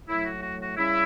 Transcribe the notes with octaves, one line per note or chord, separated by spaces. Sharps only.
A2 F#3 A3 E4
F#4
F#4
F#4
C#3 G3 C#4 E4